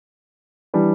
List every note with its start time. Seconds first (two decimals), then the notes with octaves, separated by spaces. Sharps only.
0.74 E3 G3 D4